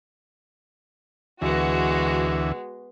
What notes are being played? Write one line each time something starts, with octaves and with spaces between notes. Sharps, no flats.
D2 E3 G#3 B3 F#4